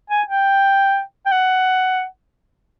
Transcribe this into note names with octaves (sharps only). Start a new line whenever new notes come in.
G#5
G5
G5
F#5